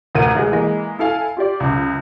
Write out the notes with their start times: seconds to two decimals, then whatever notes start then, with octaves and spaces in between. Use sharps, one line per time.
0.15 A1 D2 A#4 D#7
0.35 D2 G#3
0.52 E3 G#3 A#3
0.99 E4 A4 F5 G#5
1.37 F4 G4 D5
1.60 C#2 F#2